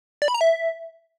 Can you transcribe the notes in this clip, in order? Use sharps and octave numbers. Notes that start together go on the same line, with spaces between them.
D5
B5
A#5
E5